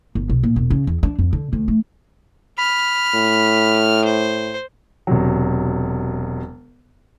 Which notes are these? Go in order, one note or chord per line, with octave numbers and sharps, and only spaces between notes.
G1
B1
A#2
E1
C#3
E2
D4
F2
D3
D2
A3
B5 F6
A2
C5
E1 C3 F#3